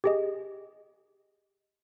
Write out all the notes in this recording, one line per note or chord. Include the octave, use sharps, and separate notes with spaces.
G4 G#4 D#5